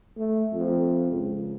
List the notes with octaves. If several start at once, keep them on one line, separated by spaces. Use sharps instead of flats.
A3
F2
C#2